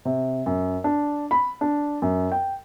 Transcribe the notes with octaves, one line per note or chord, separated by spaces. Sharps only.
C3
F#2
D4
B5
D4
F#2
G5